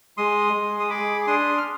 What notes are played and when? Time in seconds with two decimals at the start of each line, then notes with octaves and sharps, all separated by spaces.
0.17 G#3 C6 D#6
0.54 G#3
0.80 D#6
0.90 G#4 B5 D6
1.21 D6
1.27 D4 C6 D#6
1.57 F6